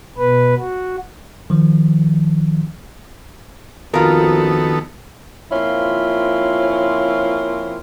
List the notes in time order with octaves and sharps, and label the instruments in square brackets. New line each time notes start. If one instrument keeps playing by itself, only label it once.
[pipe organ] B2 B4
F#4
[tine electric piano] D#3 F3
[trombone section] A#1 F2 F#4 [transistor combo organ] D#3 B3 A4 [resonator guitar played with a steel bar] F4 A#4
[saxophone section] F3 A#3 C4 C#4 E4 F4